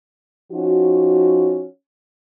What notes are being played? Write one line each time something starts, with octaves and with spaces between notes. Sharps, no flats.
F3 C#4 D#4 F#4